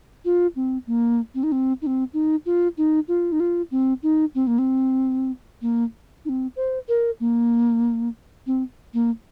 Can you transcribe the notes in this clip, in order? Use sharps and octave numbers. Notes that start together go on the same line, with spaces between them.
F4
C4
A#3
C4
D#4
C4
D#4
C4
D#4
F4
D#4
F4
D#4
F4
C4
D#4
C4
A#3
C4
A#3
D#4
C4
C5
A#4
A#3
C4
A#3